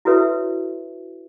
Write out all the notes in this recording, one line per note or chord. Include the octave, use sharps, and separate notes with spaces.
E4 F#4 A4 B4 C#5 E5